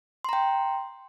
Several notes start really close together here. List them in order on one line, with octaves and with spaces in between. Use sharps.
C6 A#5 G5